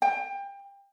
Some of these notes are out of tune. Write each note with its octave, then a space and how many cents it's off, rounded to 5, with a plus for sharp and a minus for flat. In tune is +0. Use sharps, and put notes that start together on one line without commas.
G5 +25